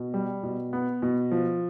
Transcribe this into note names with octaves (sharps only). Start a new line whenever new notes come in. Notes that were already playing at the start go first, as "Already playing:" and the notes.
Already playing: B2
G3
B2
B3
B2
F3